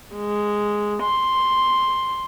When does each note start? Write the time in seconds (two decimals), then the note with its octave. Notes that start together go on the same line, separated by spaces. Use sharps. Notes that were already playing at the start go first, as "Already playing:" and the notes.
0.15 G#3
1.03 C6